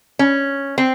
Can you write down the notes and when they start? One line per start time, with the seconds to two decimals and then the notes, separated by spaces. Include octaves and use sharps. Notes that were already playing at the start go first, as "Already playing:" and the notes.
0.19 C#4
0.78 C4